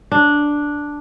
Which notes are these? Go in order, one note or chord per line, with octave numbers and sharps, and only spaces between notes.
D4